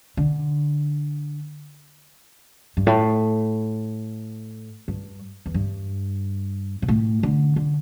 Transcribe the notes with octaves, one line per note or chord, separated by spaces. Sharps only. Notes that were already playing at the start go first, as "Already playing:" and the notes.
D3
G2
A2
G2
E2
G2
B2
A2
D3
D3